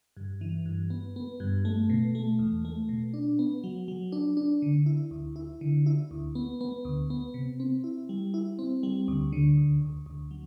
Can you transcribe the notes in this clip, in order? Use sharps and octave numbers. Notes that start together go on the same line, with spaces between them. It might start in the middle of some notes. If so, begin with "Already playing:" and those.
G2
E3
G2
B3
B3
G2
A3
B2
A3
E2
A3
B2
D4
B3
F#3
F#3
D4
D4
D3
E4
D2
E4
D3
E4
D2
B3
B3
D2
B3
C3
C4
E4
G3
E4
C4
G3
D2
D3
D2
D2
D2
F#3